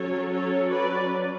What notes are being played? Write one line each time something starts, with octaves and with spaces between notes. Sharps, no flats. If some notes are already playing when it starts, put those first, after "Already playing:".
Already playing: F#3 C#4 A4 C#5
A4 C#5
B4 D5